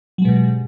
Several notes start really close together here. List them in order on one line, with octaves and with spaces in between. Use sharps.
F#3 G#3 B2 G2